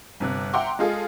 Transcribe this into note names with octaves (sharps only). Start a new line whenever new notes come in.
G1 C3 F#6
E5 F#5 G5 A#5 C6 D6
G#3 F4 G#4 A4